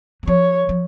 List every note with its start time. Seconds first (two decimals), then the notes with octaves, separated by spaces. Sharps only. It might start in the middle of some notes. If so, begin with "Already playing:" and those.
0.23 F#3
0.27 F3 C#5
0.69 F3